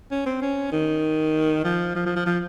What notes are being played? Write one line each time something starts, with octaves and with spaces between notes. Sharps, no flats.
C#4
C4
C#4
D#3
F3
F3
F3
F3
F3